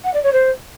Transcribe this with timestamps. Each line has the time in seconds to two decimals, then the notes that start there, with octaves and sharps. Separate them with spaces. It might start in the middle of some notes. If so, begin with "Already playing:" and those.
0.04 F#5
0.14 D5
0.23 C#5
0.33 C5